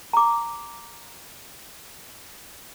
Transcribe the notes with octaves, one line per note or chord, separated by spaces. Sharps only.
A#5 D6